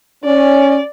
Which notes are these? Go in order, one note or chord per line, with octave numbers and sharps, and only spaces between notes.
C#4 D5